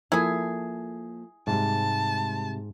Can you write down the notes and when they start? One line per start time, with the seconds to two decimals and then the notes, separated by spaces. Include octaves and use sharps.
0.12 F3 A#3 E4 G#4 A4
1.47 G#2 C3 G3 A5